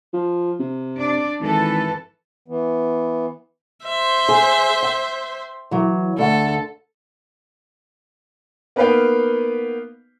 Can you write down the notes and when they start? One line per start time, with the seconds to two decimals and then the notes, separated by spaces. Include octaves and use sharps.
0.13 F3
0.60 C3
0.97 D4 D5
1.40 G#1 E3 A4 B4
2.48 E3 B3
3.83 C5 E5
4.29 G#4
4.83 G5
5.71 E3 F#3
6.18 D2 A4 F#5
8.76 A#3 B3 D#4 B4 F5 G5